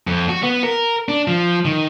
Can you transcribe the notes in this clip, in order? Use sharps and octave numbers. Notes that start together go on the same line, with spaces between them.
F2
F#4
B3
A#4
D4
F3
D#3